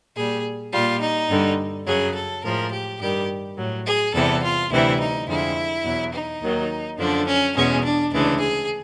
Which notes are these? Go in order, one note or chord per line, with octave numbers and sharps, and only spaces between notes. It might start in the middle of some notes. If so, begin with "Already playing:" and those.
A#2 G3 G#4
A#2 G3 F4
D#4
G2 D3 G3
F#2 C#3 F#3 G#4
A4
A2 F3 G#3 A#4
G4
G2 D#3 G3 G4
A2 F#3
G#4
E2 C3 E3 G3 A4
F4
D2 C3 E3 G3 E4
D#4
F2 D3 F3 G#3 E4
E2 B2 F#3
D#4
D#2 D#3 F#3
F#2 D3 F3 D4
C#4
E2 B2 G#3 C#4
D4
D2 C#3 E3 G#3 D4
G#4